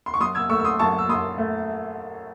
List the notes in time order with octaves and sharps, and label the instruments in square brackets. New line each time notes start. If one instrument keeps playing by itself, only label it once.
[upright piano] C6
C#6
F#2 C6 D#6
E6 G#6
A3 C#6 E6
E6
C6 D#6
F#2 A5 C#6
E6
F#2 C6 D#6
A3